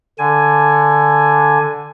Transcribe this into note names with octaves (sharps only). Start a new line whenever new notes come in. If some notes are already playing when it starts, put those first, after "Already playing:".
D3 G#5